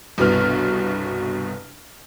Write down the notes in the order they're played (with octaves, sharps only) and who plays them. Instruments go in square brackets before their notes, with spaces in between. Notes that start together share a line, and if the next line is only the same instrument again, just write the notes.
[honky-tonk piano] G1 C2 B2 B3 F6